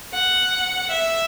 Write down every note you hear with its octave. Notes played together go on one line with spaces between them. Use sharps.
F#5
E5